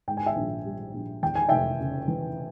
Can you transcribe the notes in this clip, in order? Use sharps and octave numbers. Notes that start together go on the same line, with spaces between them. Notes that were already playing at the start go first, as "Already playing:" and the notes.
G#2 G5
G#5
E5 G5
A#1
G3
A#1
E2 G5
G#5
F1 E5 G5
C#3
E3